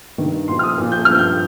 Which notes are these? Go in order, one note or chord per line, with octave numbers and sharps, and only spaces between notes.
G2 D#3
A#2 F3 C6
F6
D#6
A#2 F3
G6
G2 F3 F6
G6